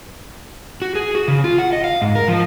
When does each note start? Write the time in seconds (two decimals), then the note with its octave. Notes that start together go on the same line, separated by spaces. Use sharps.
0.82 F#4
0.95 G#4
1.15 F#4
1.28 C#3
1.44 F4
1.58 F#5
1.73 D#5
1.84 F5
2.02 G#2
2.16 A#4
2.28 F3